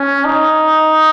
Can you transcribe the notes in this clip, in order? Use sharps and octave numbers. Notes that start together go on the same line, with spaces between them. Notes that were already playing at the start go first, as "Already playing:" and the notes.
Already playing: C#4
D#4